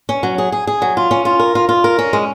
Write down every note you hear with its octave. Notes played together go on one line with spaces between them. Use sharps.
C#4
F#3
G#4
G#4
G#4
F#3
F4
C#4
F4
A#4
F4
F4
A#4
C#4
G#3